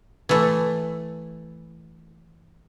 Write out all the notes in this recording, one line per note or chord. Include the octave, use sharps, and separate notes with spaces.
E3 A3